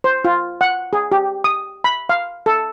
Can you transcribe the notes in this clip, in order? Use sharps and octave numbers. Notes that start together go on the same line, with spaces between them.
C5
F4
F#5
G#4
G4
D#6
B5
F5
A4